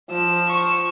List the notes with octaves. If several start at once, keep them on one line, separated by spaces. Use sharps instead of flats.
F3 E6
C#6 E6